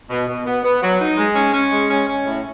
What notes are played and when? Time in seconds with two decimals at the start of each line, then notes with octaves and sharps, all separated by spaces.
0.10 B2
0.28 B2
0.46 B3
0.64 B3
0.82 F#3
1.00 D#4
1.18 G#3
1.35 C#4
1.54 C#4
1.71 G#3
1.90 C#4
2.07 C#4
2.26 A2